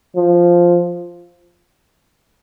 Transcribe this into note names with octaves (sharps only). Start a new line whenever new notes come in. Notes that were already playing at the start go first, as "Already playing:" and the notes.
F3